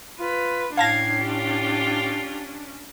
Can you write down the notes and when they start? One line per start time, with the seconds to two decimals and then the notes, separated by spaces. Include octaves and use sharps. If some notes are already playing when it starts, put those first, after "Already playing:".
0.20 F4 B4
0.77 A2 C#4 D4 F5 A5 G#6 A#6 C7
1.20 F4 G4